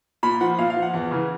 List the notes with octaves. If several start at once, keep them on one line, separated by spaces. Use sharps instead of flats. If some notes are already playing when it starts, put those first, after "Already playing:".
A#2 B5
F3 F#5
A#2 F5
F5
F3
F#5
E2
C#3 E3